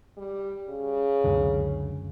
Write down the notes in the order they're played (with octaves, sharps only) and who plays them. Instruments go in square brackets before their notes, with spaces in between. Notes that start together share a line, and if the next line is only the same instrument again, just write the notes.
[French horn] G3
C#3
[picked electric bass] C#2 F#2 D3